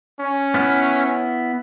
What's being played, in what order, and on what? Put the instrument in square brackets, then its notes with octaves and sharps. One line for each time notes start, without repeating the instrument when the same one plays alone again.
[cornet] C#4
[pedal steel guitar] B3 E4 F6